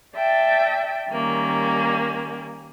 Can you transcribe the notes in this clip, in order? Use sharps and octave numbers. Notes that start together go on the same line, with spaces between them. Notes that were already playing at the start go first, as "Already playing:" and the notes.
D5 E5 G5 A5
D#3 G3 A#3 C#4